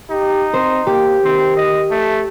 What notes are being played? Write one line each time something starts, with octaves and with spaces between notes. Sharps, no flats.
D#4 G4
C4 C5
A#3 G4
D#3 C4
D#5
A3